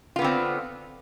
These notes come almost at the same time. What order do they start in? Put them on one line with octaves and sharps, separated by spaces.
F4 B3 D3 C4